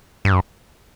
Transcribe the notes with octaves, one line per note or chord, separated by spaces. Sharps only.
G2
F#2